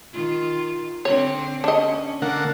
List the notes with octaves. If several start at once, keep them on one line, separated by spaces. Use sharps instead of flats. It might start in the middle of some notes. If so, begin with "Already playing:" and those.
D#3 F4
D3 C4 C#5
C#4 D4 D#5
D3 A#3 F#5